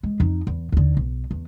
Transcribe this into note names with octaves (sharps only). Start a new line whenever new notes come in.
G#3
F2 D#4
E2
D#2 D3
B1
E2